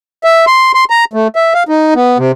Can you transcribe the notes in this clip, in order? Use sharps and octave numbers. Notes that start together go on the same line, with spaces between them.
E5
C6
C6
A#5
A3
E5
F5
D#4
B3
C3